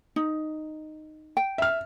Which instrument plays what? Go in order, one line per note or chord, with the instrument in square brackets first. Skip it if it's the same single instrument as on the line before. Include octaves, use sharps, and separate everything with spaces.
[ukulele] D#4
G5
[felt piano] E5 F6